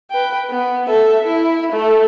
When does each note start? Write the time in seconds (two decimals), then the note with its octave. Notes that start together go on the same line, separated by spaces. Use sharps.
0.11 B4 G5
0.50 B3
0.88 A4 E5
1.26 E4
1.73 A3 A4